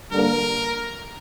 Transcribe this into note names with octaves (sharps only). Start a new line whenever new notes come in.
G2 D3 A#3 A#4